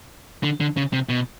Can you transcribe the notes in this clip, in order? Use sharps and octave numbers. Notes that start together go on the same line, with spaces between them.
D3
D3
C#3
C3
B2